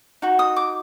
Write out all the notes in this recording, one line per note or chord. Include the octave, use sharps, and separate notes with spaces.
D#4 F#4
D#6
D6